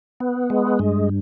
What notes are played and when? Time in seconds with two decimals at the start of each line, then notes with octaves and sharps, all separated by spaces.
0.20 B3
0.50 G#3
0.79 G2